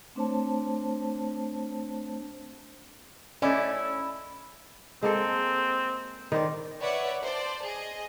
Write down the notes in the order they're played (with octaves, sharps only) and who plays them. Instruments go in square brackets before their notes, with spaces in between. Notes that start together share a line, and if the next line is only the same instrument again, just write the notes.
[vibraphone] A3 C4 D4 C5 C#5 A5
[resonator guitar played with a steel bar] A3 C#4 [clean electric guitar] E4 [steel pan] D5 D#5
[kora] G#3 A#3 A4 [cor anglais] C4
[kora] D#3 C4 D5
[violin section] B4 C#5 D5 E5 F#5
C5 D5 A5
G#4 D#5